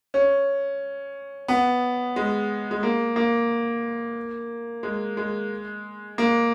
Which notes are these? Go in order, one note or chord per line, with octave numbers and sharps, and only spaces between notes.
C#4
B3
G#3
G#3
A#3
A#3
G#3
G#3
A#3